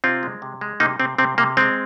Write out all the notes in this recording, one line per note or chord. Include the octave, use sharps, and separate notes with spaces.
C3 C4 F4
G#3
C3
G#3
C3 A#3 D#4
C3 C4
C3 C4
C3 A#3
G#3 C4